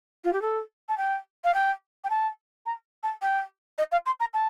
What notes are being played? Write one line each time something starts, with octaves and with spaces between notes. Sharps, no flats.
F4
G4
A4
A5
G5
F5
G5
G5
A5
A#5
A5
G5
D#5
F5
C6
A#5
A5